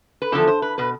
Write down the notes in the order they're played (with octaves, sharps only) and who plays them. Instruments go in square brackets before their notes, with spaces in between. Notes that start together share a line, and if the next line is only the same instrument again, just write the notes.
[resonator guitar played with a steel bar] B4
E2 D3 F3 A4
C5
B4
B2 B4